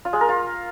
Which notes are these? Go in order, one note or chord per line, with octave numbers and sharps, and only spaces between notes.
F4
G#3
A#4
F4